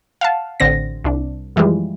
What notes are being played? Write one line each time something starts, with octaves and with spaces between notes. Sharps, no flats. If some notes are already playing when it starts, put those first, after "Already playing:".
F5 F#5 A5
A1 D3 C4 A#6
C2 D4
F#2 E3 F3 G3 G#3